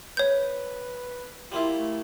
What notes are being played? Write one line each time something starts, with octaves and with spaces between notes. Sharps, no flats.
B4 C#5 G6
G3 A#3 E4 F4
A3